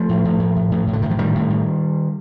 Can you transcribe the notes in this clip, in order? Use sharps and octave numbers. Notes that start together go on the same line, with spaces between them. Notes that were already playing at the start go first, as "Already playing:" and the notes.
Already playing: F3 A3
A2
A2
A2
A2
A2
A2
D3
A2 D#3
F3
A2 D#3 G3
A2
A2